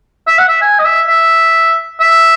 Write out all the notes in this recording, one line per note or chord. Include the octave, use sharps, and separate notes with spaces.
E5
F#5
E5
G#5
D#5
E5
E5
E5